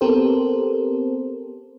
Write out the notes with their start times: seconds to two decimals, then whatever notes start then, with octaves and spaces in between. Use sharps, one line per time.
0.01 B3 C4 G4 A4 A#4 C5